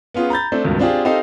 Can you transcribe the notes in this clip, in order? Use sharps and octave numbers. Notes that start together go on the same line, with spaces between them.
B3 C#4 F4 G#4
A#5 B5 G6 A6
A3 C4 D4
C#2 G2 B2 D#3
C4 D4 F4 G4 G#4
C4 D#4 G4 A4 D#5 F5